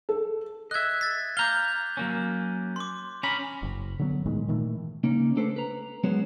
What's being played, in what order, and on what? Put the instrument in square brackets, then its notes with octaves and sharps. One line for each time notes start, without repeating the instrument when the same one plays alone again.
[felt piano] A4
[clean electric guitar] D#5 E5 [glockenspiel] F#6 G#6
[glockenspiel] A6 B6
[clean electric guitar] F5 A#5 [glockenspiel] D6 G6 G7
[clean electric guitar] F#3 A#3 C#4
[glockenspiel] C6 D6
[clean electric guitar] C#4 A#5 B5 [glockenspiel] G#5
[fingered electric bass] F#1
D3 F#3 B3
A2 D#3 G#3 B3
A#2 D#3 E3 A3
[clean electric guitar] C#3 A#3 C#4 D#4
A3 D4 A4 B4 C5
B4 A#5
F#3 G#3 B3 C#4 F#4 C5